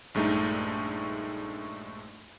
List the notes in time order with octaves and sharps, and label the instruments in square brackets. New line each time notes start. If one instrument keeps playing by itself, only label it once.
[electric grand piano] A#1 G2 G#3 A3 D#4